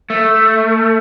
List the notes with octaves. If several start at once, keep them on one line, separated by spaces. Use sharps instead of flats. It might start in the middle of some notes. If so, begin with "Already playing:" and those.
A3